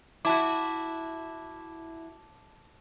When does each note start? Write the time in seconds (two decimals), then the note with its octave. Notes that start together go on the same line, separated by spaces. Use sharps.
0.25 E4 F#4 A5 D6